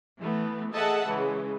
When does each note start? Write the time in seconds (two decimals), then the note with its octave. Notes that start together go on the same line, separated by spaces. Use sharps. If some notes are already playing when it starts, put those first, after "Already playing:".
0.20 E3 A3 B3
0.72 G#4 A4 D#5 E5 F#5 A5
1.07 C#3 E3 G#3